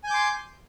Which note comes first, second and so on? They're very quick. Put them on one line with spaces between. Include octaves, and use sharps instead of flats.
G#5 G6 D6 C6